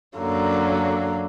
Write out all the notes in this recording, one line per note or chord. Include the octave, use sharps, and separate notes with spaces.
F#2 D3 F#3 A#3